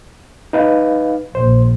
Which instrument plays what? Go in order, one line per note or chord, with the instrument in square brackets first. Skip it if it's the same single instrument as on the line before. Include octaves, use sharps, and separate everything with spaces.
[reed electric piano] D#4 B4 F5
[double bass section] A#1 [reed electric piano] C5